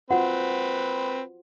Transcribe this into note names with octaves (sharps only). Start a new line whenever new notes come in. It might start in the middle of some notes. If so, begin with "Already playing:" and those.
C4 F4 F#4 B4 C5 F#5